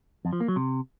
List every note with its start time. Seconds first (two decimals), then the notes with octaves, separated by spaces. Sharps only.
0.25 F2
0.33 F3
0.40 A#3
0.48 F#3
0.56 C3